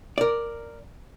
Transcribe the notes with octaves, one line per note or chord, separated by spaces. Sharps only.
A#4 D5